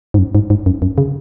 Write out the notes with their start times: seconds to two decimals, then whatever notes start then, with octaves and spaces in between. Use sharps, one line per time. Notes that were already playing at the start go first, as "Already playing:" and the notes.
0.14 G#2
0.18 F#2
0.35 G#2
0.50 G#2
0.66 F#2
0.82 F#2
0.98 C#3